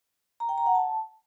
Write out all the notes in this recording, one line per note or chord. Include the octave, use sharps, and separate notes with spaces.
A#5
G5
A#5
F#5
A5